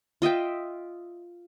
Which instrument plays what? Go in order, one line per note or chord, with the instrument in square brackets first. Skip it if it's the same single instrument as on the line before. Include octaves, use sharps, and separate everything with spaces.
[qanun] F4 D#5 E5 G5